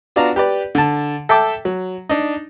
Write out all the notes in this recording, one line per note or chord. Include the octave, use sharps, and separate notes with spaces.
B3 D4 F4 F#4 D5 A#5
G4 B4 D5
D3 A5
A4 E5 G5 A5 D6
F#3
D4 D#4